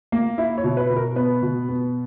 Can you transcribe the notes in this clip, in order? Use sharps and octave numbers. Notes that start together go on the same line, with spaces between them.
A#3
E4 E5
C#5
B2
B4
B2
A#4
B3 B4
B2
B3